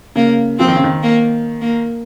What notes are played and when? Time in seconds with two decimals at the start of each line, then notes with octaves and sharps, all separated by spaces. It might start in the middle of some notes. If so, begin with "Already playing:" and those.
0.16 C#3 A#3
0.59 F3 C4
0.68 D#3
0.76 C#3
0.84 D#3
1.03 A#3
1.62 A#3